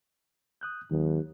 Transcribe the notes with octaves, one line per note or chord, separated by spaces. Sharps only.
D#6 F#6 G6
D#2 D#3 F#3